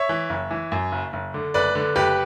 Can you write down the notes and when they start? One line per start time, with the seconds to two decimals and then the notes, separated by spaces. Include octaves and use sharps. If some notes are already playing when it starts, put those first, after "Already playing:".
Already playing: C#5 E5
0.09 E3
0.30 F#1
0.51 E3
0.72 F#2
0.92 F#1
1.13 F#1
1.34 D3
1.54 F#1 B4 D5
1.75 D3
1.96 F#1 G4 B4